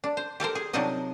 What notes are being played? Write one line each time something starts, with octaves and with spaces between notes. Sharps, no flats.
D4
C5
G4 A4 A#4 C5
G#4
C3 F3 F#3 D4 D#4 D#5